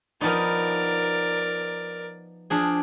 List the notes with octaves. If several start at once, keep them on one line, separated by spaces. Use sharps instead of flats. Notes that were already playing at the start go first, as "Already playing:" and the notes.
F3 B3 D#4 A#4 D5
F3 D4 G#4